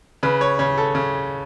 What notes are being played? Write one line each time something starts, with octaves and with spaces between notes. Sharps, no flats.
C#3 B4
C#5
C#3 C#5
A4
C#3